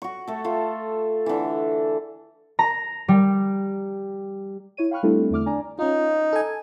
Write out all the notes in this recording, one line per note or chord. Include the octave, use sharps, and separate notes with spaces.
F#4 C#6
A3 A4
A3 F4
D3 E3
A#5
G3
E4 C#5 D#7
F5 G5 B5 C#6 F6 F#6
G3 A3 C4 D4 E4 A4
E2 D3 A3 D6 F6
D4 D5 G#5 A#5
C#4 D#4 F4
A4 G#5